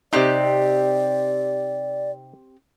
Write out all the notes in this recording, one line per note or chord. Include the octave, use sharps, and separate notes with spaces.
C3 C4 D#4 G4 D5 F#6